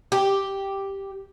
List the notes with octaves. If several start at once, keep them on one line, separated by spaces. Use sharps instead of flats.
G4